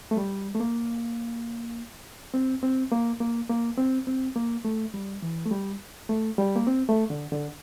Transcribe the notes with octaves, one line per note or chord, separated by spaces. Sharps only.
A3
G3
A3
A#3
C4
C4
A#3
A#3
A#3
C4
C4
A#3
A3
G3
E3
A3
G3
A3
G3
A#3
C4
A3
D3
D3